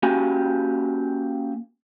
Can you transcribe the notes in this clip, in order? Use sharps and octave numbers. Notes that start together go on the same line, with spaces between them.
A#3 C#4 F#4 G4 G#5